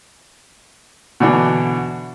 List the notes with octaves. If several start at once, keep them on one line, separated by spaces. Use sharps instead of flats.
B2 D3 E3 D4